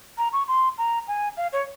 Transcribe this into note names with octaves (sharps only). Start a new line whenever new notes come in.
A#5
C#6
C6
A#5
G#5
F5
C#5